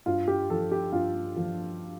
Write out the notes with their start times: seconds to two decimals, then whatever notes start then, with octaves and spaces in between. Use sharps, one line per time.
0.06 G2 F4
0.28 G4
0.50 F3 A4
0.72 G4
0.93 G2 F4
1.36 F3